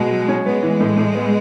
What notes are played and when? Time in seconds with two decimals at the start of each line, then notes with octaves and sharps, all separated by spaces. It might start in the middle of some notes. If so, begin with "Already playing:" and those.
Already playing: B2 G#3
0.11 F#3
0.28 C#4
0.45 G#3 B3
0.63 E3
0.80 A2
0.97 A2
1.15 B3